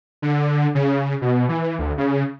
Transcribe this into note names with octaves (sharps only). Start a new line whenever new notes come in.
D3
C#3
B2
E3
D2
C#3